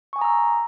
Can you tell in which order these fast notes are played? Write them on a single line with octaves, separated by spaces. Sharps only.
C#6 G#5 D#6 A#5 E6